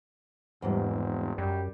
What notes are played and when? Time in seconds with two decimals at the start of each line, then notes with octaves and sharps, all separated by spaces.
0.62 F1 E2 G#2 G3
1.38 F#2 G3